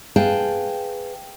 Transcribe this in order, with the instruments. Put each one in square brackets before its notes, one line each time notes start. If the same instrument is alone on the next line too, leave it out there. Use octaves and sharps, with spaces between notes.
[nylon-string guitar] G#4 B4 F5 G5 A5